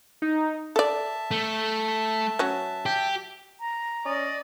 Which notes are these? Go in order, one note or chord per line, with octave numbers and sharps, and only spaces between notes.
D#4
A4 D5 E5 A5
A3
F#3 C#4
G4
A#5
C#4 D5 D#5